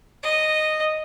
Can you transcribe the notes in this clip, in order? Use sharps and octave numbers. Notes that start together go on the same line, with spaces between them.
D#5